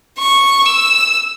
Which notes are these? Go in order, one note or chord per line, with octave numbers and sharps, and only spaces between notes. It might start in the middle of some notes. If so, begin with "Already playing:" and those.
C#6
E6